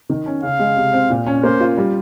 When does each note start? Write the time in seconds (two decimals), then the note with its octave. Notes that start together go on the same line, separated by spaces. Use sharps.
0.09 D#3
0.26 C#4
0.43 C#3 F5
0.59 G#3
0.76 C3
0.93 C4
1.10 A#2
1.26 C#4
1.43 A#3 C5
1.60 F4
1.77 G3